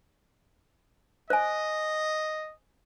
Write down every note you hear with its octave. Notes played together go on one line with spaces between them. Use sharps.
C5 D#5 G#5